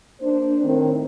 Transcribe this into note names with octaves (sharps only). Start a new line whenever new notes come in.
A#3 D4 C5
A2 D#3 C4